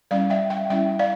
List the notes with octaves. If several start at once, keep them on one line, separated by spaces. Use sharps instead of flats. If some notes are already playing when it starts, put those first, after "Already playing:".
G3 C#4 E4 D5 F5
E5 G5
E5 G5
G3 C#4 E4 E5 G5
D5 F5